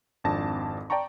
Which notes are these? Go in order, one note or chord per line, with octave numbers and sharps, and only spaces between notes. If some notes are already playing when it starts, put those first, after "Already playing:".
G#1 F2 D4 A5 A#6
D5 G5 A5 A#5 C#6